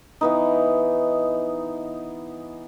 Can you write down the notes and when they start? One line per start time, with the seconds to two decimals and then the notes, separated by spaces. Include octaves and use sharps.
0.21 E3 B3 D#4